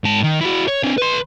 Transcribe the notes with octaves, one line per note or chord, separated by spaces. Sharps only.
G#2 A5
D#3
E4 F#4
C#5
C4 D4
B4 C6